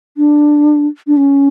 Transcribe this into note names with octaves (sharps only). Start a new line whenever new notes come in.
D4
D4
C#4